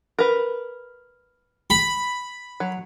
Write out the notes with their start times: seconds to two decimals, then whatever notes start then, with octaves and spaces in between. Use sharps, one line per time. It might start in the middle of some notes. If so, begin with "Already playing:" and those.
0.19 A#4 B4
1.70 B5
2.60 F#3